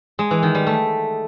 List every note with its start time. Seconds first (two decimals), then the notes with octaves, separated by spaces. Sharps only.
0.19 G#3
0.31 E3
0.43 D#3
0.55 G3
0.67 A3